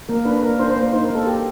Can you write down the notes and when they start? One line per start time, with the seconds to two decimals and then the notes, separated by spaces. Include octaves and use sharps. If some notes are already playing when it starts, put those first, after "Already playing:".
0.09 A#3 A#4
0.25 D4 B4
0.36 B4
0.43 A#3 A#4
0.59 D4 C5
0.70 C5
0.76 A#3
0.82 C5
0.93 D#4 C5
1.05 A#4
1.10 A#3 A4
1.27 G4